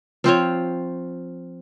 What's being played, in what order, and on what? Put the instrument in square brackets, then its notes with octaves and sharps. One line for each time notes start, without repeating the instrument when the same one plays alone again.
[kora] F3 C4 F4 C#5